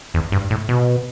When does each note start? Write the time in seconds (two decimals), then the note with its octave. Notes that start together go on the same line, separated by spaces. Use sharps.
0.14 E2
0.32 G2
0.50 A2
0.69 B2